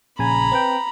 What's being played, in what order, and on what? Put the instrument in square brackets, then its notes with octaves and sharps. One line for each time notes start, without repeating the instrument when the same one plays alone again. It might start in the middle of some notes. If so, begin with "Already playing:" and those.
[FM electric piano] A#1 C#3 G#5 [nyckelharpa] A#5 B5
[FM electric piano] C4 B4 G5